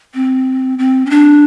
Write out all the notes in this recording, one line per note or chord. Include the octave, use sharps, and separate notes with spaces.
C4
C4
C#4
D4